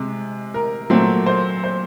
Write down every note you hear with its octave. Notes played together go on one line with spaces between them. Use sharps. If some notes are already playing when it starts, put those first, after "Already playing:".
Already playing: C3 G#3
A#4
A#2 F#3 A3 C4
C5
C5